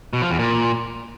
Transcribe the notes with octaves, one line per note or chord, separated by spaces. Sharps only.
B2
F3
E2
A#2